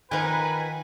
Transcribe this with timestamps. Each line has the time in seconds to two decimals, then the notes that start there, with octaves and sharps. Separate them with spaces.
0.12 D#3 F3 D#4 A#4 B4 F#5 G#5